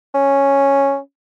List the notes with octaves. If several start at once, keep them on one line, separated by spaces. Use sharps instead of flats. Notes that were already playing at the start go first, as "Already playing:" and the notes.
C#4